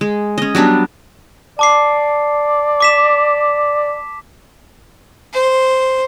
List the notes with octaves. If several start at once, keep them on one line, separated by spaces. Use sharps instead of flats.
G#3
C#4 D#5
F#3 G3 B3 D4
D5 A5 D6 C7
D6 B6 E7
C5